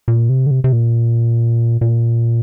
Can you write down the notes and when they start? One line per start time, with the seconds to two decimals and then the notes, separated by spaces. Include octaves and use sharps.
0.08 A#2
0.29 C3
0.47 D3
0.51 C3
0.64 C3
0.73 A#2
1.81 A#2